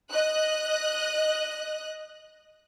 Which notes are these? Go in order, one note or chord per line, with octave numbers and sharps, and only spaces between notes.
D#5 F#6